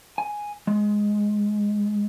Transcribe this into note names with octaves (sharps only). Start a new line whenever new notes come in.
G#5
G#3